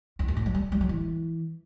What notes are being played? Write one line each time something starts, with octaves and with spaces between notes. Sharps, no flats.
E2
F#2
A2
F#3
G3
G3
F#3
E3